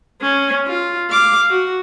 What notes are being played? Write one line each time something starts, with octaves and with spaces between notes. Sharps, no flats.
C#4
F4
F5 D6
F#4